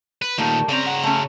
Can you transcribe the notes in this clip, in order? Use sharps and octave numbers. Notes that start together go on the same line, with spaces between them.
B4
A#2 D#3 G3 A3 A#3
C#3 C4 C#4 D5 A#5
F#5
A3 C#4